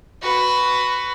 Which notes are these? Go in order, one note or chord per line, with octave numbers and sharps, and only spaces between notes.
F#4 B4